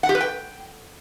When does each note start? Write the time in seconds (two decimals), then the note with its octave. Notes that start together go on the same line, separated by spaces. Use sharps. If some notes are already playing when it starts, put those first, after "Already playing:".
0.03 F#5
0.09 G4
0.15 B4
0.21 G5